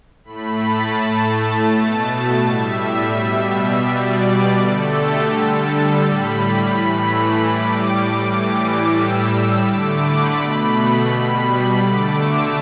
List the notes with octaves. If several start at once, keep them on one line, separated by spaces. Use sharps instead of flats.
A2 A3 B5
A5
A2 A3 A5
B2 A3
A2 G3 E5
B2 G3
B2 G3 D5
D3 A3 A4
G4
D3 G3 A4
A4
A2 G3 B5
B5
A2 E3 A3
A2 G3 D6
A2 E3 G3
A2 G3 E6
D3 A3 D6
B5
B2 A3 B5
B2 G3
D3 A3 D6
E6